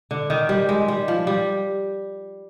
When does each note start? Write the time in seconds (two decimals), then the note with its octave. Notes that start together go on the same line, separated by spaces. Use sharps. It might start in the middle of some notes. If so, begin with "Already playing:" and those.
0.11 D3
0.30 D#3
0.49 G3
0.69 G#3
0.88 G3
1.08 F3
1.27 G3